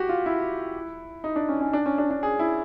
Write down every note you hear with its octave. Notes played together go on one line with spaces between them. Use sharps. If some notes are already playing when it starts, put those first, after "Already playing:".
Already playing: F#4 G4
F4
E4
D#4
D4
C#4
C#4
D4
C#4
D4
D4
G#4
E4